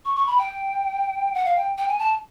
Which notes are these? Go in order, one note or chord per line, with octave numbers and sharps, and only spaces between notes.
C#6
C#6
B5
G5
F#5
F5
G5
G5
G#5
A5